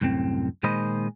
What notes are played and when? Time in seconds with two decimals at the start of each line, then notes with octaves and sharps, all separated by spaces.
0.01 C2 F#2 A2 C4
0.63 A#2 D#3 G#3 C5 D#5 B5